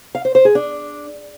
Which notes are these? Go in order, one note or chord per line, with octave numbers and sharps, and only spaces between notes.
F5
C5
C5
G#4
D4